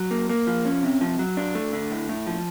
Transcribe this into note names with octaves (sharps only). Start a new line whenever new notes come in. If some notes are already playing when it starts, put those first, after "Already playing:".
Already playing: F#3
A#3
A#3
F3
C#4
C3
F3
F#3
D4
A3
D3
A2
A2
F3